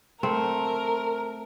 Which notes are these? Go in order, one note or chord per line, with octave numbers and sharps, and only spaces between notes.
A3 C4 A#4